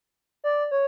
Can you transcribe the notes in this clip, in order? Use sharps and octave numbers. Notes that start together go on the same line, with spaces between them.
D5
C#5